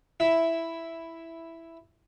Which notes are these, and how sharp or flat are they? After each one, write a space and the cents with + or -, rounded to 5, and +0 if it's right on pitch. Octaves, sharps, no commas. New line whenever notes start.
E4 +0 E5 +0